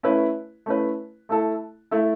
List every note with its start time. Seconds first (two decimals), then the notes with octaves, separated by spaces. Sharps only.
0.03 A3 C#4 E4 B4
0.66 A3 C#4 E4 B4
1.29 A3 E4 A4
1.91 A3 E4 A4